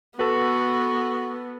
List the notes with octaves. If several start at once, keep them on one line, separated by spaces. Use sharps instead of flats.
B3 F#4 A4 B4